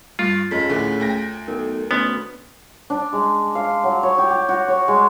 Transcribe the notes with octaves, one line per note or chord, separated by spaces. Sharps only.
G2 F4
F2 C#3 G#3 B6
D2 A2 D3
D2 G5 A#6
B1 A4 A#4
D2 B3 C#4 C6 F6
D4
G#3
F5
F#3
C#5
G4
G4
F#4
C#5
G#3